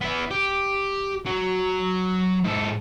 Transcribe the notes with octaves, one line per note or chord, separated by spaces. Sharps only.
B3 E4
G4
F#3
G#2 A4